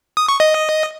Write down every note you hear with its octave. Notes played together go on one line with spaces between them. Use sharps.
D#6
C#6
D#5